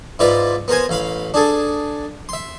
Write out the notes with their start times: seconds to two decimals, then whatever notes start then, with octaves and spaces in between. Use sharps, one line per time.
0.19 G#2 E4 F4 B4 D5
0.68 B3 A#4 C5 G#5
0.89 A1 F5 B5
1.34 D4 G#4 A4
2.29 E5 C6